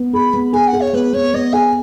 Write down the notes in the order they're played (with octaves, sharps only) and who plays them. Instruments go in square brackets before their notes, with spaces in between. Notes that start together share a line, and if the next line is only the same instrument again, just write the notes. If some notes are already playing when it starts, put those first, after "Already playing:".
Already playing: [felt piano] B3
[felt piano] G#4 [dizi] B5
[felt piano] B3
[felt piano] G#4 [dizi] G#5
[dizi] F#5
[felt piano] G#4
[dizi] C#5
[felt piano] B3 [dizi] B4
[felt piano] B3 [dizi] C#5
[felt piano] B3 [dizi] D#5
[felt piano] G#4 [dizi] G#5